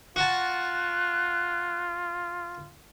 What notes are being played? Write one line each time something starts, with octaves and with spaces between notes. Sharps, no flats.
F4 F#4 A5 F#6